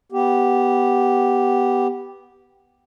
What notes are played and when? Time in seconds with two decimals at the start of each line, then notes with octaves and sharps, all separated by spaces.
0.12 B3 G4